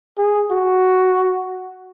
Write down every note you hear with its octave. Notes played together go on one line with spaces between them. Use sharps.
G#4
F#4